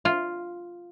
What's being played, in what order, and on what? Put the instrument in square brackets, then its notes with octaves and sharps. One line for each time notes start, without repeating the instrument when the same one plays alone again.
[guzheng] F4